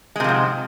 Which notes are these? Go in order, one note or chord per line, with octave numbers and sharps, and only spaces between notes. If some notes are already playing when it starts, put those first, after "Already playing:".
G#2 C3 F3 G#3